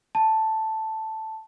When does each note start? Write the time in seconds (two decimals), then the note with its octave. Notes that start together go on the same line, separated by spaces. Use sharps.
0.15 A5